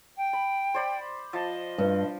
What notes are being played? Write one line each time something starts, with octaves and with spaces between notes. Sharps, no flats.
G5
B5
C5 D5 B5
F3 D#5 A5
G2